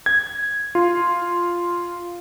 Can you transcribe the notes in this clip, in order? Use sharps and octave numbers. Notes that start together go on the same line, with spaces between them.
G#6
F4